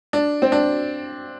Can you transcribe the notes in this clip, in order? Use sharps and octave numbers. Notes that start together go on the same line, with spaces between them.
D4
C4
D4